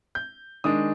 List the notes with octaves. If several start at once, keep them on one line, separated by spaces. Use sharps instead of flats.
G6
D#3 G#3 D4 D#6